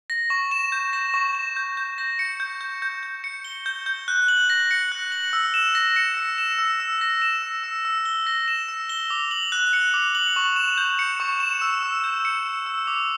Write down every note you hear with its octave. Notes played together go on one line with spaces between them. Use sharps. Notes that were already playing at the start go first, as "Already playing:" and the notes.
A#6
C#6
E7
G6
A#6
C#6
E7
G6
G6
A#6
C#7
G6
G6
G6
G6
C#7
G7
G6
G6
F#6
F#7
A#6
C#7
F#6
F#7
E6
E7
A#6
C#7
E6
E7
E6
E6
A#6
E7
E6
E6
E6
G7
A#6
E7
E6
G7
D6
F#7
F#6
C#7
D6
F#7
C#6
E7
G6
C#7
C#6
E7
E6
E6
G6
C#7
E6
E6
D6